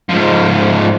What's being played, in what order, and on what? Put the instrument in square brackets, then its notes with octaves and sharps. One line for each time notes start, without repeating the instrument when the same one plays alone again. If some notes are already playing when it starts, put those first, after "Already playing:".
[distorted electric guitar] G#2 F3